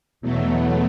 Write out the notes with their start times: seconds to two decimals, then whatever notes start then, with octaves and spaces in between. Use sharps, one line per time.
0.21 E2 B2 F#3 A3